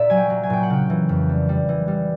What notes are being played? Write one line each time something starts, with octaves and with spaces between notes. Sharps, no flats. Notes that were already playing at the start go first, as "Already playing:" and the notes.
Already playing: A#2 D5 E5
F#3 G#5
G5
F#3
G#5
A#2 G5
F#5
C#3 G5
E3
F2
G3
G3
E3
G3